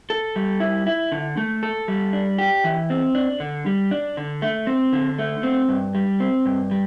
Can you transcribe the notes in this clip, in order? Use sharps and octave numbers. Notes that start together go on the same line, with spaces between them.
A4
G3
E4
E4
D3
A3
A4
G3
D4
G4
E3
C4
D4
D3
G3
D4
D3
A3
C4
D3
A3
C4
G2
G3
C4
G2
G3